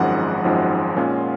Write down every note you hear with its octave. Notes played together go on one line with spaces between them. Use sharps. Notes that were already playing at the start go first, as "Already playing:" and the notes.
Already playing: G#1 F#2 F3 G#3 D#4 F#5
G#1 F#2 F3 G#3 D#4
A#2 G#3 C#4 F4